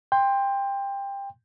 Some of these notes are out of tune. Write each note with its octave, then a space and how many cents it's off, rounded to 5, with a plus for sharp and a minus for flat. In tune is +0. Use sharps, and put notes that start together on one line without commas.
G5 +20 C6 +0